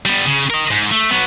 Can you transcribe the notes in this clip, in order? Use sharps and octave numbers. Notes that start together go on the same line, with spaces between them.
G3 B3
C#3
A#4 D#5
G#2
A3
F#3 B3